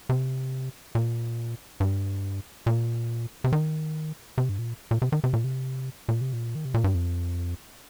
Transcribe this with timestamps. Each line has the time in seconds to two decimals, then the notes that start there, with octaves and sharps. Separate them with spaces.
0.09 C3
0.95 A#2
1.80 G2
2.66 A#2
3.44 C3
3.53 D#3
4.38 C3
4.49 G2
4.59 A#2
4.91 A#2
5.02 C3
5.12 D#3
5.24 C3
5.33 A#2
5.44 C3
6.09 A#2
6.21 C3
6.33 A#2
6.55 D#3
6.65 C3
6.74 A#2
6.84 G2
6.94 F2